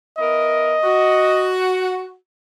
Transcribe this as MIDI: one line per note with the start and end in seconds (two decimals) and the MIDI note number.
0.19 0.76 59
0.19 0.76 64
0.19 0.76 70
0.19 1.54 75
0.83 2.15 66